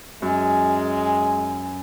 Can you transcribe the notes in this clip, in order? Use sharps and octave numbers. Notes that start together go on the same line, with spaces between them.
F#2 G#3 G#5